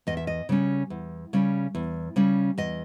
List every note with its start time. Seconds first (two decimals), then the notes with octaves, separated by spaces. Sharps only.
0.07 E2 D#5
0.17 E5
0.27 D#5
0.49 C#3 G3 C#4
0.90 E2
1.33 C#3 G3 C#4
1.75 E2
2.16 C#3 G3 C#4
2.58 E2 D#5